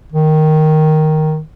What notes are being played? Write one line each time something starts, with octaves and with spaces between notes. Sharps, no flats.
D#3